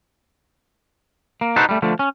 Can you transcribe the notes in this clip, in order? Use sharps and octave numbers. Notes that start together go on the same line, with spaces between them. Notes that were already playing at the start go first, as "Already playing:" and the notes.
A#3
D#4 F#4 A4 B4 C5
G3 A3
D3 F3 A3
C#4